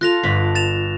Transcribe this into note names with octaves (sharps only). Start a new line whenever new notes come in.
F4 A4 F#6 A#6 F7
G1 D4 B6
A6 E7 F7